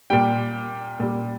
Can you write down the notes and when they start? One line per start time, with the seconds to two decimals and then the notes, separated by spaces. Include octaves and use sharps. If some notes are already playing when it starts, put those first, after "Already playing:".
0.10 A#2 G3 G5
1.00 A#2 G3